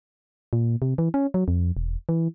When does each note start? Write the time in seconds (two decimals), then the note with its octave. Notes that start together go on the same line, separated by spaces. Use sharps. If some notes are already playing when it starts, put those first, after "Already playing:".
0.53 A#2
0.82 C3
0.98 E3
1.14 C#4
1.34 F#3
1.48 F2
1.77 E1
2.09 E3